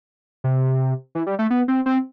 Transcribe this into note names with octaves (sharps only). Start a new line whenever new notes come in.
C3
E3
G3
A3
B3
C4
C4